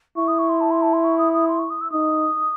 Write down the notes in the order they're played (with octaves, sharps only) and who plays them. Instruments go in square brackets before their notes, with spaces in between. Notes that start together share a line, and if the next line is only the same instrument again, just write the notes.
[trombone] E4 [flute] C#6
[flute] D#6
C#6
C6
A5
C6
A5
C6
C#6
D#6
D#6
C6
C#6
D#6
E6
[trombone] D#4 [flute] D#6